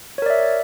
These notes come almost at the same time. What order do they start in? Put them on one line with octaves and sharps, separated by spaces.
C#5 A#4 D5 E5